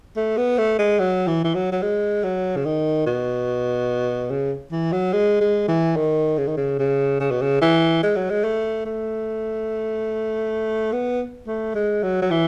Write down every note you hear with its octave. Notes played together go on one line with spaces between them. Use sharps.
A3
B3
A3
G#3
F#3
E3
E3
F#3
F#3
G#3
F#3
C#3
D#3
B2
C#3
E3
F#3
G#3
G#3
E3
D#3
C#3
D#3
C#3
C#3
C#3
B2
C#3
E3
G#3
F#3
G#3
A3
A3
B3
A3
G#3
F#3
F#3
E3